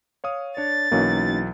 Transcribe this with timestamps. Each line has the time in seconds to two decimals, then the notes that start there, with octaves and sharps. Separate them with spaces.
0.24 C#5 F5 D#6
0.57 D4 C#5 A6
0.92 B1 E3 F#3 A#3 C#4 D#4